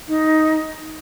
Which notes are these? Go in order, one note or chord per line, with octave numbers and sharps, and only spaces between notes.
D#4